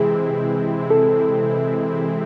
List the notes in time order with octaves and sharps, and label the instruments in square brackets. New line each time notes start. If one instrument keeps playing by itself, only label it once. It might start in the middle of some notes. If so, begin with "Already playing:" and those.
Already playing: [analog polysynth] C3 E3 G#3 C4 E4 [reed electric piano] G#4
[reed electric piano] A4